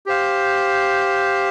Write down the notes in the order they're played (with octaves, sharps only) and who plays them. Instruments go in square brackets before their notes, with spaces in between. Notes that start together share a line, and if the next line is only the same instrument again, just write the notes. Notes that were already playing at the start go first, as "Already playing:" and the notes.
[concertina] G4 C5 F5